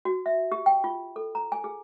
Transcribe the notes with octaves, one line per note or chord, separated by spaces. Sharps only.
F#4
E5
G4
G5
F4
A4
A#5
G#5
G#4